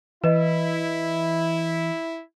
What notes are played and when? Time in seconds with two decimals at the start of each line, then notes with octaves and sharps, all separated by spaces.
0.24 E3 E4 B4 D#5